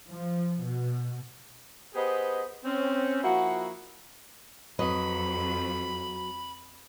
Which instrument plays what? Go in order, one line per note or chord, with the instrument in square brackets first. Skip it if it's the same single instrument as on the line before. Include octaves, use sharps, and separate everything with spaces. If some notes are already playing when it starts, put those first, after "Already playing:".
[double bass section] F3
B2
[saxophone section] B3 G4 G#4 B4 C5 D#5
C4 C#4
F3 A#3 E4 F#4
[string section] F2 [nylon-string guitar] F#3 B4 D#5 [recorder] B5